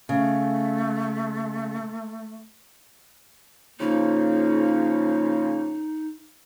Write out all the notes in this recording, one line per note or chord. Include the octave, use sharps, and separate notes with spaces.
C#3 A3
C#3 F3 A#3 D#4